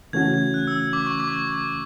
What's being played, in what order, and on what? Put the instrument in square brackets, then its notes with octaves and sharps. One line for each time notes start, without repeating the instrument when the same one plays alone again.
[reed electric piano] C#3 E3 A3 C#4 F#4 [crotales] G#6
[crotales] G#6
F#6
E6
E6
D6
C#6
D6